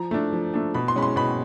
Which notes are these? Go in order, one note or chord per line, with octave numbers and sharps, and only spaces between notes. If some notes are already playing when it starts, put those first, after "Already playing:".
Already playing: F3 A#5
A3 D4
F3
A3 D4
B2 B5
C6
G#3 C#4 B5
C6
B2 B5